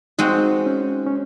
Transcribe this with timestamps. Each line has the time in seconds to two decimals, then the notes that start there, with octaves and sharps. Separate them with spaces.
0.19 G#3 C4 D#4 F#4
0.66 C#4
1.06 C#4